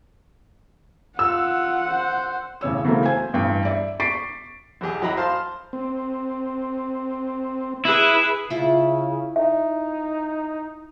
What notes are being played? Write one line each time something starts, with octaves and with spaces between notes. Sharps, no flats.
F4 F#5 E6
C5
A1 C#3 C#5 E6
C#3 E3 F#3 A3 A#3 C4
C5 G#5 G#6
A1 G2 G5
D5 E5
C#6 D6 A6 B6 C7 D7
B1 E2 G4 G#4
F#2 F#3 E4 D#5 A#5 B5
C5 F5 A5 C6
C4
E4 G#4 B4
C#3 E4 F4
D#4 E5